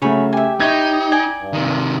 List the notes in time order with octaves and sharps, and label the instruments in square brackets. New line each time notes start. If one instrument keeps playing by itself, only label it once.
[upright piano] C#3 A3 [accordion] F#3 [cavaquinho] C#5 G#5 B5
[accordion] G4 [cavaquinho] E5 G#5
[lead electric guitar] D#4 [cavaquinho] E4 C#5 G5 [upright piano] G#6
[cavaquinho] D5 G5 G#5
[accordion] G2
[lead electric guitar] C3 D#3